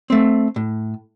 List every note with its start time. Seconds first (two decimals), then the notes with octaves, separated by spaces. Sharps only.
0.10 A3 C4
0.56 A2